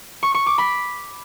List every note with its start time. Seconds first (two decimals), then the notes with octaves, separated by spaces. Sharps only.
0.23 C#6
0.35 C#6
0.46 D6
0.58 B5